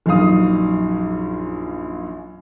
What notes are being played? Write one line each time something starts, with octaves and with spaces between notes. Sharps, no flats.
A#1 F#2 D#4 F5 D#6